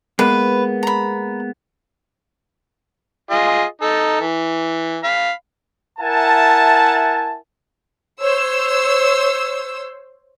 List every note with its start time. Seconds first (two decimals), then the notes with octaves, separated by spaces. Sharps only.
0.19 G#3 A#3 B3 B4
0.83 A#5 B5
3.31 F4 G#4 D#5
3.82 D#4 A4
4.21 E3
5.04 F5 B5
5.99 E4 A#4 E5 F#5 G#5 A5
8.20 C5 C#5 E6